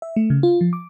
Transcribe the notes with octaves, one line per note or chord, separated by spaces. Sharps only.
E5
A3
C#3
F4
F3
D6